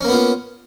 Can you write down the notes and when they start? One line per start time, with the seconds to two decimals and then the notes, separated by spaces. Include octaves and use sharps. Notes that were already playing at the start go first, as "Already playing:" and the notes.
0.01 C#4
0.04 A#3
0.08 B3
0.12 F4